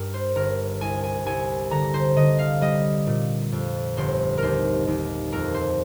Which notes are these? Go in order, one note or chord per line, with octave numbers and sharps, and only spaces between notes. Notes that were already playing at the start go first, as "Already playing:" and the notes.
Already playing: G2 A#4
C5
G1 A#4
C2 G#5
G#5
C2 G#5
D3 A#5
C5
D3 D#5
F5
G3 D#5
A#2
F2
G1 C5
D#2 A#4 C5
D#2
F2 A#4
C5